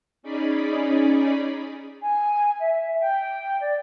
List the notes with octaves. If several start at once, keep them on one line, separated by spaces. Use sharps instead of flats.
C#4 D#4 G#4 D5 B5
G#5
E5
G5
D5